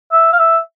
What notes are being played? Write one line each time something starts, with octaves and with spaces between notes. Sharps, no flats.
E5
F5
E5